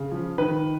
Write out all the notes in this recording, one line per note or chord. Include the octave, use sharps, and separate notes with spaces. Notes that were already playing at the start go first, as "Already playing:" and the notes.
Already playing: C#3
F3
D#3 B4